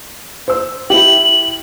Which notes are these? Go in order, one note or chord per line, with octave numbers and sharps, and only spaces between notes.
C5 E6
E4 G4 F#7